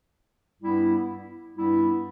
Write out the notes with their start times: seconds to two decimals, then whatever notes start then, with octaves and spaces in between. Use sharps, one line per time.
0.62 G2 G3 B3 E4
1.56 G2 G3 B3 E4